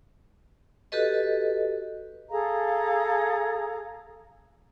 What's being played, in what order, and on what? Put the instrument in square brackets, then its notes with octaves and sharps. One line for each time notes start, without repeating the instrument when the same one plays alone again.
[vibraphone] F#4 G4 A4 B4 D#5
[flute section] G#4 A4 F5 A#5